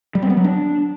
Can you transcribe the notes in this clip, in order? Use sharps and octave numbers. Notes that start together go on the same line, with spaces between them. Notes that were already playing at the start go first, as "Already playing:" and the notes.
G3
C4
B3
F#3
D4